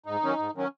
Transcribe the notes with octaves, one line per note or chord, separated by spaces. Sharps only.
G#2 D#4
D#3 F#3 C#4
G#2
D#3 F#3 C#4